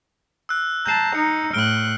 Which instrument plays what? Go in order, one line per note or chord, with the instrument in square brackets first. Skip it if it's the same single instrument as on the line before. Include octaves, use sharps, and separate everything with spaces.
[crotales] E6 F#6
[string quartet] A5 A#5 [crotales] G6 C7
[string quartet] D#4 [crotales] C#7
[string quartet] A2 F#6 [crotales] F6 D7 G7